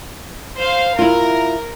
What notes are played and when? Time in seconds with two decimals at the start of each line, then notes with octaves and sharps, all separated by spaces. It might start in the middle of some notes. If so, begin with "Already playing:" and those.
0.59 C5 F5
0.99 E4 F4 A#4